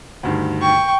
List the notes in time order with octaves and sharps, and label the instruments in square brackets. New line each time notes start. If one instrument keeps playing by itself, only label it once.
[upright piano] D2 G2 D#3
[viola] G5 [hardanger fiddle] C#6